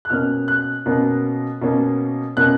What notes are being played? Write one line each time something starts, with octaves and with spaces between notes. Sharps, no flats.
F#6
B2 A#3 C#4 F6
F#6
B2 A#3 C#4
B2 A#3 C#4
B2 A#3 C#4 F#6